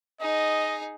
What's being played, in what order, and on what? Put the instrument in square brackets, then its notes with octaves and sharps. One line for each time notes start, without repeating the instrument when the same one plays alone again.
[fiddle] D#4 G#4 [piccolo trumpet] D#5